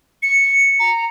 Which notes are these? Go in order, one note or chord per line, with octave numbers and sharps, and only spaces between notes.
C#7
A#5